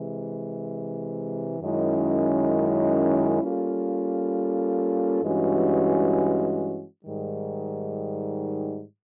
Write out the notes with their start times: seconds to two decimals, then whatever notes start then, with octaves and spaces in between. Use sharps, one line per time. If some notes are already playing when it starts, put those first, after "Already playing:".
Already playing: C3 E3 G#3
1.60 F#2 D#3 G#3 C#4 E4
3.41 G3 A#3 C#4 F4 A4
5.22 G2 E3 G#3 C#4 F#4
7.03 G#2 D#3 G3